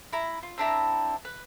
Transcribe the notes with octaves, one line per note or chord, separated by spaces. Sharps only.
E4 A#5
F4
C4 D4 E4 A#5
B4